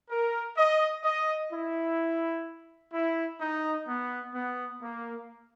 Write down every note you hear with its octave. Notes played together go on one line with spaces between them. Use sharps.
A#4
D#5
D#5
E4
E4
D#4
B3
B3
A#3